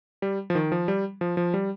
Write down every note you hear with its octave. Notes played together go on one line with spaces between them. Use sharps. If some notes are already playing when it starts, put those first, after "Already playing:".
G3
F3
D#3
F3
G3
F3
F3
G3